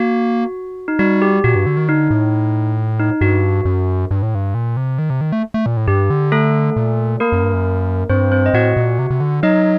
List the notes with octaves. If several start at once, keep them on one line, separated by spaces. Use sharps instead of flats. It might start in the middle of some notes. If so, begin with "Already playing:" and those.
Already playing: A#3 F#4
D#4
G3 F#4
G4
A#2 F#4
G2
D3
D#3
D3 D#4
A2
D#4
G2 F#4
F#2
G2
A2
G2
A#2
C3
D#3
C3
D#3
A3
A3
A#2
A2
G2 G4
D3
A3 A4
A#2
A#3 A#4
F#2
G2
F#2
G2 C4 C5
C4 C5
D#5
A2 F#4 F#5
A#2
C3
C3
D3
F#3 D#4 D#5